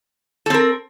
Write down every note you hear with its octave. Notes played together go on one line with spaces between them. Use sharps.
C4 A4 A#4